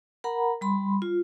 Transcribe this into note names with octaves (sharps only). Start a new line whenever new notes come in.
A#4 F#5 A#5 B5
G3 B5 C6
F4